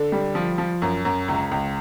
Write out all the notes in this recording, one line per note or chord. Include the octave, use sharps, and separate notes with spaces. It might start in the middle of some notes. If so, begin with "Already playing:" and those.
Already playing: D3
G3
F3
F3
F#2
F#2
C#2
C#2